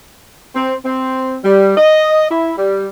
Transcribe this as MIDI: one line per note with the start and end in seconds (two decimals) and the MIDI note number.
0.55 0.74 60
0.85 1.36 60
1.43 1.75 55
1.77 2.27 75
2.30 2.51 64
2.57 2.86 55